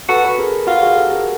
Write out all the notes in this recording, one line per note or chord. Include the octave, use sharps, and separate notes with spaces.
F#4 A4 B4
A4 B4
G#4 A#4
F4 F#4 G#4
F#4 G#4
G4 A4
G#4 A#4